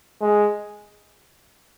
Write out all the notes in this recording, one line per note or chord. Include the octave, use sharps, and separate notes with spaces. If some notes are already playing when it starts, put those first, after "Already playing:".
G#3